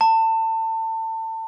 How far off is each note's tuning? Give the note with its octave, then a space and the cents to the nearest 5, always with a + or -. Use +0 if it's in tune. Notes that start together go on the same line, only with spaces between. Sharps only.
A5 +30